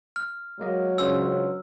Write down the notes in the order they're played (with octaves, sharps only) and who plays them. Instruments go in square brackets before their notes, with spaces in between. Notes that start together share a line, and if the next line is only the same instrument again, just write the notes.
[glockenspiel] F6
[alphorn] F#3 [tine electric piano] G#3 A#3 D#5
[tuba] C#2 [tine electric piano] C#4 D4 C5 [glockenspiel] E6